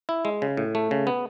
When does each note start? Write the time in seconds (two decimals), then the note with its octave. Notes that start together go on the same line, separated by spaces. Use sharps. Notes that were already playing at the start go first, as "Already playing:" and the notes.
0.09 E4
0.25 G#3
0.42 C#3
0.57 A2
0.75 A3
0.91 C#3
1.07 B3